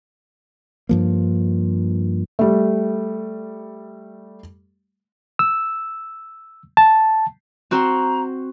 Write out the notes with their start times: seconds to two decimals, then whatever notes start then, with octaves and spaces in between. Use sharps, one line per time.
0.89 G2 F3 A#3
2.39 G3 A3
5.39 E6
6.77 A5
7.71 C4 F#4 C5 A#5